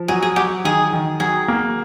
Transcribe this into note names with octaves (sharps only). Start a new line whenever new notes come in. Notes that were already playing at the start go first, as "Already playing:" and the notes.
Already playing: F3
F#3 G#4
G#4
F#3 G4
D#3 G#4
D#3
F#3 G#4
A#3